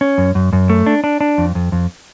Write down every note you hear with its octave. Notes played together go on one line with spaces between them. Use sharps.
C#4
F#2
F#2
F#2
A3
D4
D4
D4
F2
F2
F2